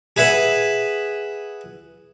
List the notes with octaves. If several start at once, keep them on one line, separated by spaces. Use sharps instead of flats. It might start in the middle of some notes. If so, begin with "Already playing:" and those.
G#4 B4 E5 F#5